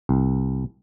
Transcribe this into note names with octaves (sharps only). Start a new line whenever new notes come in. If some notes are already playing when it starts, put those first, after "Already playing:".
C2